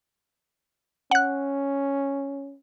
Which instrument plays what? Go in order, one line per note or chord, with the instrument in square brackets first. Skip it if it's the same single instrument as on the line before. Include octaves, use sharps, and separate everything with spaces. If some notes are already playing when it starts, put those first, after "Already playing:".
[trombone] C#4 [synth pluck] F#5 F#6